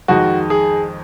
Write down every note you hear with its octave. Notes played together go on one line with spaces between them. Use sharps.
F2 D#3 G#3 D#4 F#4
G#4